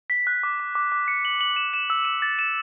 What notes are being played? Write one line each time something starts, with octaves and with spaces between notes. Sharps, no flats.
B6
F#6
D6
D6
D6
D6
C#7
F#7
F#7
E7
E7
E6
E7
A6
E7